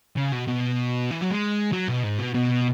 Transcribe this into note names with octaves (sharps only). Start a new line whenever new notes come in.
C#3
B2
B2
E3
F#3
G#3
F#3
B2
G#2
B2
B2